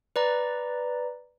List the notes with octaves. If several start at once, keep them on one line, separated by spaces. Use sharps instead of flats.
B4 D5 A#5